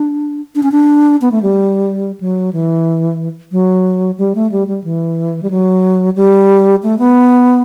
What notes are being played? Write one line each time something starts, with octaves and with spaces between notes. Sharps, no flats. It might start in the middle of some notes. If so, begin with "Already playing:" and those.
Already playing: D4
D4
C#4
D4
B3
A3
G3
F#3
E3
F#3
G3
A3
G3
G3
E3
G3
F#3
G3
A3
B3